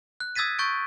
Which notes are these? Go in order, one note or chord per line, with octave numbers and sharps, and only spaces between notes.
F#6
D#6 E6 G#6 A6 B6 D#7
C#6 G6 A6 D7